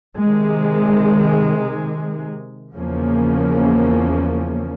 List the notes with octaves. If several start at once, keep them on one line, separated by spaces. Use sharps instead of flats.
C3 D#3 G#3
E2 C#3 F3 A#3 C#4